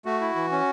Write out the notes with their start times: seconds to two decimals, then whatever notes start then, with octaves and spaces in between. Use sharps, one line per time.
0.06 A3 F#4
0.21 E4
0.36 E3
0.52 C#4